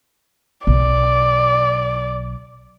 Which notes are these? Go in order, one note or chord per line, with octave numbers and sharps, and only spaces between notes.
B1 D5